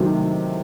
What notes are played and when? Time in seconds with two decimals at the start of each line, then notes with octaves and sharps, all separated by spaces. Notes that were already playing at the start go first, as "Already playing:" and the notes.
Already playing: C3 D#3 F#3 A3 C4